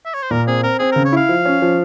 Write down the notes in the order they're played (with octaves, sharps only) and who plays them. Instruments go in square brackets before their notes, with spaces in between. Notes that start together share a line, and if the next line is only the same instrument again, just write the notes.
[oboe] E5
C#5
C5
[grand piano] A#2 [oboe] A#4
[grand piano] C4 [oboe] G#4
[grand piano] C4 [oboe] A#4
[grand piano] C4 [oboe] G#4
[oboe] A#4
[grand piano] C#3
[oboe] C#5
[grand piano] E4 [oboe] F5
[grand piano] F3
C#4
F3